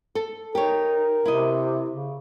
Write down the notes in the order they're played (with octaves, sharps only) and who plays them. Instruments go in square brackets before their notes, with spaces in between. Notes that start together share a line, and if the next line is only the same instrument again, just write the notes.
[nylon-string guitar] A4
[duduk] D#4 [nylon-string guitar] G4 C#5 [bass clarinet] A#4
[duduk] C3 [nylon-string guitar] E4 D#5
[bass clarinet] C#3